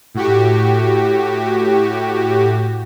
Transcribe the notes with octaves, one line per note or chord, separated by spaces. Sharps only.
A2 F#4 G4